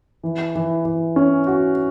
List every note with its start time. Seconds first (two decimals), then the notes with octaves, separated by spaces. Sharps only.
0.24 E3
0.55 E3
0.85 E3
1.16 C#4
1.47 F#4